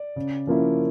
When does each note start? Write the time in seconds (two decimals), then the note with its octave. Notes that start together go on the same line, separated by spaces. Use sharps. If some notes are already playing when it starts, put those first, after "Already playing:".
Already playing: D5
0.16 C#3
0.47 F3 A#3 C#4 E4